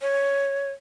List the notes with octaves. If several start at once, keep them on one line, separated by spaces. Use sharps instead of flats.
C#5